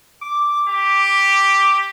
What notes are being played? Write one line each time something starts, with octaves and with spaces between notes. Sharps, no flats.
D6
G4